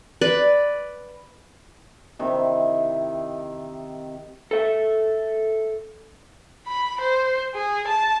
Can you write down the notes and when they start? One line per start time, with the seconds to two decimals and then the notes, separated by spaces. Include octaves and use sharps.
0.21 B4 D5 B5
2.19 C3 D#3 E4
4.51 A4 E5
6.67 B5
7.01 C5
7.55 G#4
7.88 A5